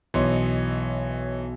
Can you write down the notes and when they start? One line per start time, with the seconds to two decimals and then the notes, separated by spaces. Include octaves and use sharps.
0.14 B1 E3 C#5 D#5 C6